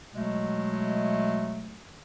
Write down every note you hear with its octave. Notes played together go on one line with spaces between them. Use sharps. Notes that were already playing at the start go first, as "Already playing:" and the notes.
B2 F#3 G#3 A3